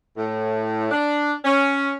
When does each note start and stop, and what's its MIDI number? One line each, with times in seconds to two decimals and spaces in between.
0.16 0.88 45
0.91 1.33 62
1.45 1.94 61